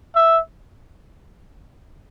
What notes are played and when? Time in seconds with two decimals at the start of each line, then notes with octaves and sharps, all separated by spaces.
0.15 E5